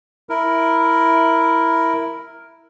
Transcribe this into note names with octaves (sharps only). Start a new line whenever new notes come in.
E4 A#4